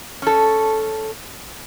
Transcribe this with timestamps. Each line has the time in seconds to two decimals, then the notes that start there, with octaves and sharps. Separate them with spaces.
0.22 C#4 A4